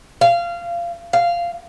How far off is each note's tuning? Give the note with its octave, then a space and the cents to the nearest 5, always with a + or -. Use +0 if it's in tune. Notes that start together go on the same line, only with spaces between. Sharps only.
F5 -20
F5 -10